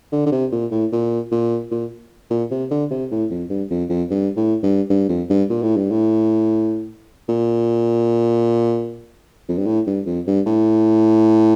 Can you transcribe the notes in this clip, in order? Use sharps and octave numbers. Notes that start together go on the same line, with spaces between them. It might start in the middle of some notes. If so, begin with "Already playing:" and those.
D3
D3
C3
A#2
A2
A#2
A#2
A#2
A#2
C3
D3
C3
A2
F2
G2
F2
F2
G2
A2
G2
G2
F2
G2
A#2
A2
G2
A2
A#2
F2
G2
A2
G2
F2
G2
A2